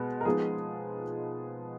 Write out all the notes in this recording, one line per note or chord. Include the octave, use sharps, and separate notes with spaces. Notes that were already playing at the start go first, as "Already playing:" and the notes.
Already playing: B2 G#3 B3
A#4
F3 G#3 B3 D#4 G#4